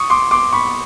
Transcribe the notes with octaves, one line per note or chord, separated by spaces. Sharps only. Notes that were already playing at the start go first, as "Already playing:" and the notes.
Already playing: C#6 D#6
C6 D6
C6 D6
B5 C#6